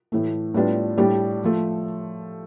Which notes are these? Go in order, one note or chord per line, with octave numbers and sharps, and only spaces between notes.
A2 E3 A3
A2 G3 B3 D4 F4
A2 G3 D4 G4
F3 A3